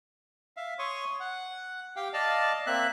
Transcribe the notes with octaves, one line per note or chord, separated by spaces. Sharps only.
E5 F5
C#5 C6 C#6 D#6
F#5
G4 F5 G5
D5 D#5 F5 A5 F6
A#3 C4 E5 F#6